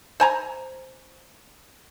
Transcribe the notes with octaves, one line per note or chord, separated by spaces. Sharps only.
C5 G#5 A#5